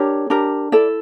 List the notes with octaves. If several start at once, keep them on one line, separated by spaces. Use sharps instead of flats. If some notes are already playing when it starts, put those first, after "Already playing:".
Already playing: D4 G4 A#4 C#5
D4 G4 A#4
E4 A4 D5